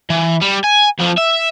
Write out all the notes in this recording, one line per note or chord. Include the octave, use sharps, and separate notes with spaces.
E3
G3
G#5
F2 F3
E5